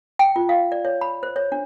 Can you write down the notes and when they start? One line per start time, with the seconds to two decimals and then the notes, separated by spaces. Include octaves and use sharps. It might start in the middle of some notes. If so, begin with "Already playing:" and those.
0.19 G5
0.36 F4
0.49 F5
0.72 D5
0.85 C#5
1.01 B5
1.23 C5
1.36 C#5
1.52 D4